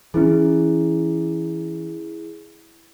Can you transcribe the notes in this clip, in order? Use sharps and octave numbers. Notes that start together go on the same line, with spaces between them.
E3 C#4 E4 G#4